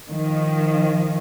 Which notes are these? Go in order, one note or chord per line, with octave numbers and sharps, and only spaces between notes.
D#3 F3